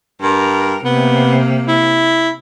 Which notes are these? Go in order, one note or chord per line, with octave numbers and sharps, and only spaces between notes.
G2 A#4
C3 A#3 B3
E4